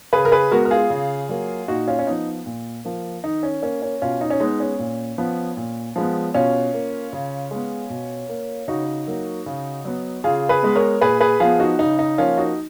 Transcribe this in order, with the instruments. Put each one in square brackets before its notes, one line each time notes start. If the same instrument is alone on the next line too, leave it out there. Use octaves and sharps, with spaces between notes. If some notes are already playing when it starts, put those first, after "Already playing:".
[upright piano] C#3 G#4 B4
A#4
G#4 B4
G#3 B3 F#4 A#4
A#4
F4 G#4
C#3
F#3 A#3
A#2 D#4 F#4
C#4 F4
C#4
F3 B3 D#4
A#2
F3 A#3
D#3 D#4
C#4
A#3 C#4
C#4
B2 C#4 F4
D#4
C#4
G#3 B3 D#4
C#4
A#2
F3 B3
A#2
F3 G#3 B3
B2 C#4 F4
A#3
C#3
G#3 B3
B2
A#3
C#3 D#4 F#4
F#3 A#3
C#3
F#3 B3
C#3 F4 G#4
G#4 B4
G#3 B3
A#4 C#5
A#2 G#4 B4
G#4 B4
F3 B3 F4 G#4
D#4 F#4
C#3 D#4
D#4
F3 A#3 C#4 F4
D#4 F#4